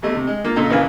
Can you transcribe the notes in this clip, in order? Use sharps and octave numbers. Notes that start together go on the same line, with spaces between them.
E2 G3 A3 D#5
C3
G#3
A#3 F4
A#2 C#3 A4 D#5 A#5
A#1 C#3 E3 A#4 F5 G#5